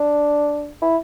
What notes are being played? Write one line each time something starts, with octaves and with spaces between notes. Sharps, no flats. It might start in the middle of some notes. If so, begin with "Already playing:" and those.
Already playing: D4
E4